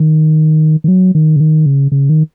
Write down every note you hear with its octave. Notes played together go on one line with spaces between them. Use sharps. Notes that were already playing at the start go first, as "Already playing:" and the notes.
Already playing: D#3
D#3
F#3
D#3
C#3
D#3
C#3
C#3
D#3